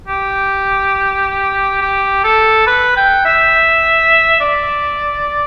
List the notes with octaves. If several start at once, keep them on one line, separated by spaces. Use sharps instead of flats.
G4
G4
A4
B4
G5
E5
D5